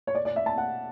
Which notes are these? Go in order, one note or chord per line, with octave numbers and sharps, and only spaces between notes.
C#5
D5
D5
E5
A5
F#5